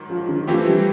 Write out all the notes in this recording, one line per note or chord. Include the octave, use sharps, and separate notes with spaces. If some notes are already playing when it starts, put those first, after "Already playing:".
Already playing: G#2 D#3 F#3
F3
D#3
E3 F3 A3 C4 E4 G4
G3